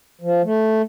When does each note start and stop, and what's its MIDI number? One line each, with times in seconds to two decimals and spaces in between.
0.21 0.42 53
0.45 0.82 57